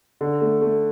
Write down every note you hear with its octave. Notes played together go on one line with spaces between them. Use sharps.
D3
A3
A3